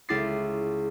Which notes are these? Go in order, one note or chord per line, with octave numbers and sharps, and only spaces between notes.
C#2 E4 D6 A6 C7